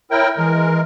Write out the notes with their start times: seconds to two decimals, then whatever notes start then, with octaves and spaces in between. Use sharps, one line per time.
0.11 E4 A#4 C#5 G5
0.37 E3 G#3 A#4